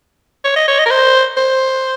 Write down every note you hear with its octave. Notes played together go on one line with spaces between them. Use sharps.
C#5
D#5
C#5
D#5
A#4
C5
C5